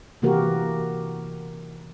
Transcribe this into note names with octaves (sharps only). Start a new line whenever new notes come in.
C3 E3 A#3 F#4 G4 A#4